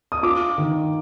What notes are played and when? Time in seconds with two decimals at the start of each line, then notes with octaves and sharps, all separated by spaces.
0.12 D#6
0.23 F4 D6
0.58 D#3